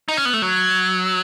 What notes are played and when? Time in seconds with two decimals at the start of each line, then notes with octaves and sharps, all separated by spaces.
0.08 D#4
0.17 C#4
0.25 B3
0.33 A3
0.42 F#3